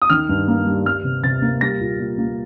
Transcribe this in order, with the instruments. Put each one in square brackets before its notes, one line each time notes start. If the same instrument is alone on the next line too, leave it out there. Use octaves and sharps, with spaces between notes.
[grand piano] D#6
D#3 F6
G2
A#3
G3
G3 F6
C3
C3 A6
A#3
G3 A#6
A#2
A#2
A#3